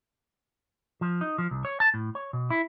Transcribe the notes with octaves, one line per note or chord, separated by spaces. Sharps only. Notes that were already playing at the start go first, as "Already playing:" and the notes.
F3
D#4
F3
C2
C#5
A5
A2
C#5
B2
E4